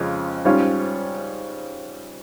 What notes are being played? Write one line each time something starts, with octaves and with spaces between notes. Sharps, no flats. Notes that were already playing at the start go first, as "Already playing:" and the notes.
Already playing: F2 C#3 G#3 C#4 F4
G#2 G3 C#4 F4 C#5